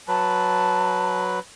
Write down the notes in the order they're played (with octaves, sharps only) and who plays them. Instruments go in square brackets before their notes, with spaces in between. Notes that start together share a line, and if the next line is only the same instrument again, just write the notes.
[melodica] F#3 B4 [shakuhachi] A5